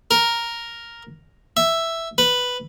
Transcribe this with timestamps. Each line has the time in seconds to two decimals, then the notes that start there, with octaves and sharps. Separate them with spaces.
0.11 A#4
1.57 E5
2.18 B4